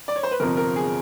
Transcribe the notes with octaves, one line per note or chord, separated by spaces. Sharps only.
D5
C#5
C5
B4
G1 F2 C3 F3 A#4
A#4
G#4